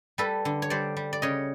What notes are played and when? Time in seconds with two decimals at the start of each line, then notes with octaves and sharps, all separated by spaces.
0.18 G3 A4 B4
0.45 D3
0.62 C#5
0.70 G3 C5 D5
0.97 G3
1.13 D5
1.22 C#3 C#5 D#5